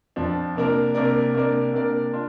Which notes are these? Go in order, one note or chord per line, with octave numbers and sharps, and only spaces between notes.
F2 F3 D4
C3 A#3 D4 A#4 D5
C3 A#3 D4 A#4 D5
C3 A#3 D4 A#4 D5
C3 A#3 D4 A#4 D5
D4 F4